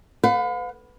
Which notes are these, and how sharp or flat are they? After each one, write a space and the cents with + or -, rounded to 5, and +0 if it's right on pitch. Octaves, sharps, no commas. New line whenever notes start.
B4 +30 F5 +45